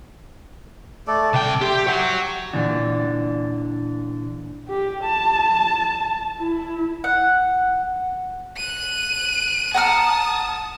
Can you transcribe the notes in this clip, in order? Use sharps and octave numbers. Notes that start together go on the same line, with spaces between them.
A3 A4 D5
C2 D5 G5 A5
G4 E5 C6
C#5 E5 F#5 G5
A#2 D3 E3 D4
G4
A5
E4
F#5
F#6 D#7
F#5 A5 A#5 D#6 F6